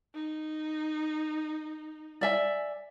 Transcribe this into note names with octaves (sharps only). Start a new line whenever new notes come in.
D#4
D5 E5 G#5